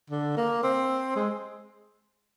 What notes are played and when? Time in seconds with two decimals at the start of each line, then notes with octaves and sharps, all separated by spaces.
0.10 D3
0.37 A#3
0.63 C4
1.16 G#3